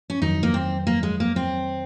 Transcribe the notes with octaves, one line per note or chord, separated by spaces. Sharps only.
C#4
F2 D#3 F#3 D#4
A#3
C4
A#3
G#3
A#3
C4